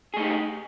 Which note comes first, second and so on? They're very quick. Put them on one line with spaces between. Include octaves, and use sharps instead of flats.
G#4 A3 D#4 G4